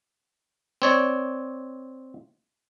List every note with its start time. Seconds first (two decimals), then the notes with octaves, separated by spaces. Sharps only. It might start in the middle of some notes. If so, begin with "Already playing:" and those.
0.82 C4 C#5 D5